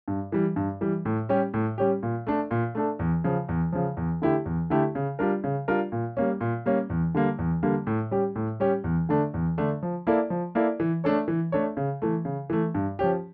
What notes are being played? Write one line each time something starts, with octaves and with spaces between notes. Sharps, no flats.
G2
E3 G3
G2
E3 G3
A2
G3 C#4 G4
A2
G3 C#4 G4
A#2
A3 D4 A4
A#2
A3 D4 A4
E2
C#3 F3
E2
C#3 F3
E2
D3 A3 E4 G4
E2
D3 A3 E4 G4
C#3
G3 D4 F4 A#4
C#3
G3 D4 F4 A#4
A#2
G3 A#3 C#4
A#2
G3 A#3 C#4
E2
D3 G3 A#3
E2
D3 G3 A#3
A2
G3 C#4 G4
A2
G3 C#4 G4
E2
D3 A3 D4
E2
D3 A3 D4
F3
A#3 E4 A4 D5
F3
A#3 E4 A4 D5
E3
A3 D4 A4 C#5
E3
A3 D4 A4 C#5
C#3
E3 A3
C#3
E3 A3
G2
F3 C#4 G4